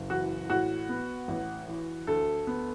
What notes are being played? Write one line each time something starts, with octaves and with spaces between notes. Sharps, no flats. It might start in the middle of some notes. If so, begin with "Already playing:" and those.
Already playing: F#1
E3 F#4
A2 F#4
B3
A1
E3
D2 A4
B3